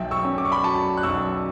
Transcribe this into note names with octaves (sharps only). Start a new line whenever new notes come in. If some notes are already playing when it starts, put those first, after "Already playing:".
Already playing: B1 E5 G5
C#6 E6
C#4
D6
C#6
B5 D6
F#3 A5 C#6
F#6
B1 C#6 E6